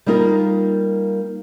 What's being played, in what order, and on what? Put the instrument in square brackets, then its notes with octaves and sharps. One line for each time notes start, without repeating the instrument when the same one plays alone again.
[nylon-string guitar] G3 A#3 D#4 F4 A#4